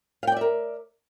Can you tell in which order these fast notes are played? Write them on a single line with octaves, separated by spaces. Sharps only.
F5 G5 D5 E5 A#4